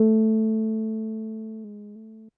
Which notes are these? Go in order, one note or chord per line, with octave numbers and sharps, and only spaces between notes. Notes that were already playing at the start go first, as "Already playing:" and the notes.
Already playing: A3
G#3
A3